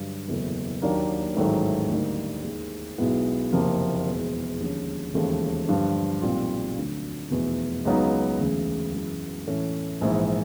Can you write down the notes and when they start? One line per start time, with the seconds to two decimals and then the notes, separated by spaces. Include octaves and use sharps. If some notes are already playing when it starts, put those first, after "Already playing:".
Already playing: G2 D3 F#3
0.28 F#1 E2 B2 F#3 A3
0.82 D#2 D#3 F#3 A#3 D4
1.36 A1 G#2 D#3 F#3 A3
1.89 D2 D3 G3 A#3 D#4
2.43 D#2 D#3 G#3
2.98 B1 B2 G#3 B3 E4
3.52 F#1 F2 C3 F3 A#3
4.06 E2 B2 G#3
4.60 D#2 D3 F3 G#3 C#4
5.14 E1 D#2 C#3 F3 A3
5.68 G2 D3 F3
6.22 B1 A#2 G3 C4 F4
6.76 D2 D3 F#3
7.30 F1 E2 B2
7.85 C#2 C#3 F#3 B3 D#4
8.39 E1 D2 C#3
8.93 F#2 C#3 E3 G#3
9.47 A2 E3 A3 C#4
10.01 A#1 G#2 E3